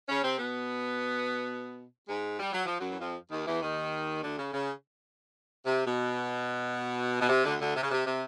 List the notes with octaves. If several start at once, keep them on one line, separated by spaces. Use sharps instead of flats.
C#3 C#4
C3 C4
B2 B3
G#2 G#3
G3
F#3
F3
F#2 F#3
E3
F2 F3
D#2 D#3
E2 E3
D#2 D#3
D2 D3
C#3
C#3
C3
B2
B2
C3
D2 D3
D2 D3
C3
C#3
C3
C3